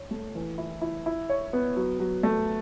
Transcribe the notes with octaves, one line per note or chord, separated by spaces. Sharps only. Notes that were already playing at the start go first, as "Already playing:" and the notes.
Already playing: C#5
A3
E3
E4
E4
E4
C#5
B3
F#3
F#3
A3